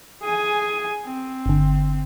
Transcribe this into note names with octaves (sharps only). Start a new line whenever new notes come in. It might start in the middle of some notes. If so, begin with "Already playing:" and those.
G#4 G#5
C4
G1 D3